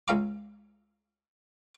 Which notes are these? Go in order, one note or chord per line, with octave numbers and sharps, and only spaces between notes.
C#2 C#4 E5 F5 A#5 D6